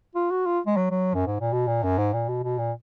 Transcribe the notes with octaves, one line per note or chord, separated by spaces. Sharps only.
F4
F#4
F4
G#3
F#3
F#3
F#2
G#2
A#2
B2
A#2
F#2
G#2
A#2
B2
B2
A#2